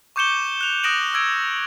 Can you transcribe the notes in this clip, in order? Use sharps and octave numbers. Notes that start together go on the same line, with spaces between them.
C#6 D6 G6 C#7 E7 G7
F#6 F7
D#6 F#6 A#6 D7 E7 F#7
E6 G#6 D7